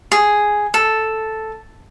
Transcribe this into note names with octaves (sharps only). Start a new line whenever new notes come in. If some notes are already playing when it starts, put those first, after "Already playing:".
G#4
A4